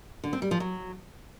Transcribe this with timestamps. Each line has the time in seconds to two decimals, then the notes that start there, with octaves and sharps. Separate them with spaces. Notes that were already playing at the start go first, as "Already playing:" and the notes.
0.24 D3
0.33 C4
0.42 G3
0.51 F3
0.60 F#3